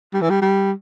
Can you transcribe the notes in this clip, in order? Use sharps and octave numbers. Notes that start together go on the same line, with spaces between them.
G3
E3
G3
G3